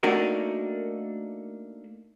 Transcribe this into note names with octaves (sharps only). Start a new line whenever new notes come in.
A3 A#3 D4 D#4 F#4 A#4